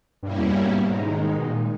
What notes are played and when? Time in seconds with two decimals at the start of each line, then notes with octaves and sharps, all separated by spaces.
0.23 G2 B2 G3 A#3 C#4 E4
0.39 E2
0.54 G2
0.70 G#2
0.86 D#3 G#3 D#4
1.38 B2
1.48 A#2